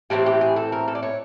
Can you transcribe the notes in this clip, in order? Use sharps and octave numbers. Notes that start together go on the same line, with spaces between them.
A2 E3 A3 C4 G4
G4
G#4
A4
A#4
A4
D5
C#5